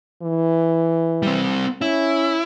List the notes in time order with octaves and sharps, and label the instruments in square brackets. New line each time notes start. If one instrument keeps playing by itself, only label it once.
[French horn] E3
[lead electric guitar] G3 C4
[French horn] C#4 [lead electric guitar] E4